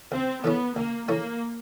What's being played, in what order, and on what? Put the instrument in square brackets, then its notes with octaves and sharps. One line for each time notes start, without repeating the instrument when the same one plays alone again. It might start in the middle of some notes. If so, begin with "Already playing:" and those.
[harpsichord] C#2 [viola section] C4
[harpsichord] C#3 E3 A3 C#4 [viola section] B3
[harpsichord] C#2 [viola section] A#3
[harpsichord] C#3 E3 A3 C#4 [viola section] A#3